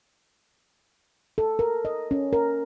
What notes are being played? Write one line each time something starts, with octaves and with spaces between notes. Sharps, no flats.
A4
A#4
D#5
C#4
A#4